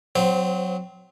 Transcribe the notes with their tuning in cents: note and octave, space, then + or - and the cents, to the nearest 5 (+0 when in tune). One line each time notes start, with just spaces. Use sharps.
F#3 -5 C4 -30 C5 +0